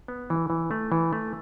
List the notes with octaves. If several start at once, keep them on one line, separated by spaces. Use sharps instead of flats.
B3
E3
E3
A3
E3
A3